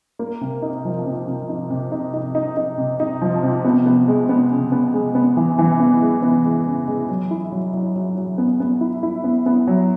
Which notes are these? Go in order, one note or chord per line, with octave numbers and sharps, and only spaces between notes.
A#3
C3
D#4
F3
C3
C3
D#4
C3
D#4
D#4
D#4
D#4
C3
D#4
F3
C3
B3
B3
G#3
B3
C#3
B3
G#3
B3
E3
E3
B3
G#3
B3
G#3
C#3
G#3
F#3
E4
F#3
F#3
F#3
F#3
B3
B3
E4
E4
B3
B3
F#3